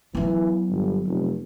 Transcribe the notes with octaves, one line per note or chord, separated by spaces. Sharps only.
E3 F#3 B3
G1
F1